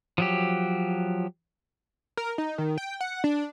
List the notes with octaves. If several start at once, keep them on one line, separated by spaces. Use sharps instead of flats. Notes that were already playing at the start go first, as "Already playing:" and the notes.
F3 F#3 G4
A#4
D#4
D#3
G5
F#5
D4